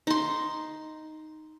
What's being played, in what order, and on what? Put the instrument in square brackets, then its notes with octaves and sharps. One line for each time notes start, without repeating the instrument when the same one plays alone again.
[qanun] D#4 C6